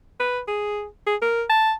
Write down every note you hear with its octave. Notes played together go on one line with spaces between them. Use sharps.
B4
G#4
G#4
A#4
A5